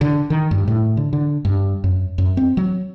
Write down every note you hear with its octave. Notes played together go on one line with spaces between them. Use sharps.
D3
D#3
G2
A2
D3
D3
G2
F#2
F#2
C4
F#3